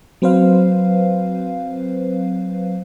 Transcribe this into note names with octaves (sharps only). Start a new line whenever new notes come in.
F#3 C4 B4 C5 F5